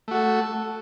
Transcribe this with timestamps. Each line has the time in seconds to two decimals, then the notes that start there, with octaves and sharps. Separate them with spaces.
0.08 A3
0.11 F#4
0.15 A4